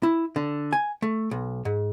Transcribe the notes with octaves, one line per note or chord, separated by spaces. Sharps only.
E4
D3
G#5
A3
B1
G#2